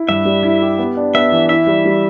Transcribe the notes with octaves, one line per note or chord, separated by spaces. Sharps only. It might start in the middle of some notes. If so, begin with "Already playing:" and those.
Already playing: E4
G2 E5
G3
E4
G4
B3
D4
B3 E5
E3
E4 E5
G3
G3